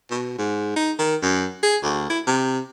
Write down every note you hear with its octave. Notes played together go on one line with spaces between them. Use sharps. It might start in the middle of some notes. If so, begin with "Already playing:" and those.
B2
G#2
D#4
D#3
F#2
G#4
D2
E4
C3